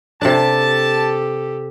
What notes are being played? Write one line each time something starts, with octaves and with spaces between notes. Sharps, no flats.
C3 D4 G4 A4 A5